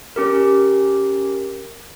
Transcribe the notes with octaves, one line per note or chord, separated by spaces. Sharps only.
C#4 G4 A#4